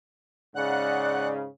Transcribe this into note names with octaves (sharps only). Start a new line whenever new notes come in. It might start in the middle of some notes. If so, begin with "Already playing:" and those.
G#2 C#3 D5 F#5 F#6